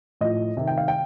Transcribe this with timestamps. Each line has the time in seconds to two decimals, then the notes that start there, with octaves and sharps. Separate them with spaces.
0.21 A2 F3 D#5
0.57 C3 D#3
0.67 G5
0.77 F5
0.88 G5